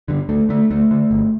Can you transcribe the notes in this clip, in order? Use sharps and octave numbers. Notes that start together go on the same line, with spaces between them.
G2 D3
D2 A3
D3 A3
D2 A3
D3
G1